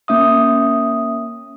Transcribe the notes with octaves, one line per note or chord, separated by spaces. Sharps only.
A#3 C#4 E5 D#6